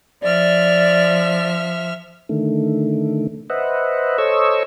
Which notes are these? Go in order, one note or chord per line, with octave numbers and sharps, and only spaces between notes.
F3 D5 E5 F6
D3 D#3 A3
B4 C5 D#5 E5 F#5
A4 C5 C#5 D#5 C#6 E6